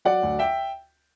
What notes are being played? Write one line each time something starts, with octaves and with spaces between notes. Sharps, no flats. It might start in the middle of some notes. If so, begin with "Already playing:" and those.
F#3 D5 F#5
D2
E5 G5